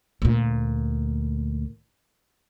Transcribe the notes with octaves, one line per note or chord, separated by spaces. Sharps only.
D2 A#2